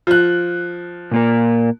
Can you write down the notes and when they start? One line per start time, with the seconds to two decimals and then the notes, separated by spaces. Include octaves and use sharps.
0.07 F3 F#6
1.12 A#2 A#3 A#4